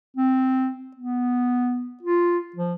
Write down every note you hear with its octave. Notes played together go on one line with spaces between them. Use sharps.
C4
B3
F4
F3